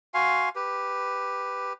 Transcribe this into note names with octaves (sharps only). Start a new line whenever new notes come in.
F#4 F5 G#5 C6
G4 B4